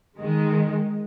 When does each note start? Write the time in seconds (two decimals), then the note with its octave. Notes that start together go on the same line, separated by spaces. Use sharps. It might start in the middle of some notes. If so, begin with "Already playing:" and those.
0.20 D#3 G#3